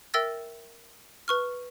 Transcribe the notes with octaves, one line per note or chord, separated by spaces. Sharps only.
A#4 E5 G5 E6 A6 A#6
B4 C#6 F6